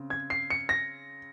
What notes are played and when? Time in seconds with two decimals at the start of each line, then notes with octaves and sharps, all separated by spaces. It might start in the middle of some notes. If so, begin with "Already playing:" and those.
Already playing: C#3 C4
0.10 G#6
0.30 C7
0.50 C#7
0.69 A#6